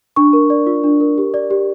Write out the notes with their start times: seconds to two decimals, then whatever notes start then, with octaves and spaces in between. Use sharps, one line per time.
0.16 D4 C#6
0.33 A#4
0.50 D5
0.67 F4
0.84 D4
1.00 A#4
1.18 G4
1.34 D5
1.51 G4